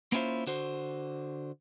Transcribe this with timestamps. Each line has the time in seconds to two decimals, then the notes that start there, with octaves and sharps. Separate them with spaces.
0.12 A#3 B3 C#4 E4 F4 C5
0.47 D3 F#4 C5